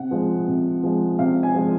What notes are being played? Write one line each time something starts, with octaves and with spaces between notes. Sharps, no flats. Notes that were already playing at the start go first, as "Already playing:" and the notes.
Already playing: C3 F#5
F3 G#3
C3
F3 G#3
C3 F5
G#5
F3 G#3